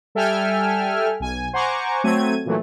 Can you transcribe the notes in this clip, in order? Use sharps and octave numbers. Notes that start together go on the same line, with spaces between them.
G3 A4 E5 G5 G#5 F6
B1 G#5
C5 F#5 G#5 A#5 C#6 D6
F#3 A3 C4 G#6 D#7
A#2 E3 F#3 A3